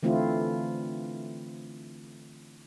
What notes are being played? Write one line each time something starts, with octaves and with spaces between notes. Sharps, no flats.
D3 E3 A3 C4 E4 F4